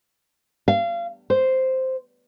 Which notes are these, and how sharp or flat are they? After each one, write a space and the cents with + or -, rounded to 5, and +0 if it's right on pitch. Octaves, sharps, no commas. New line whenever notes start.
F5 -30
C5 -5